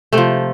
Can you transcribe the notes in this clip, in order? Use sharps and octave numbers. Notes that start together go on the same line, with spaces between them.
C3 F3 A3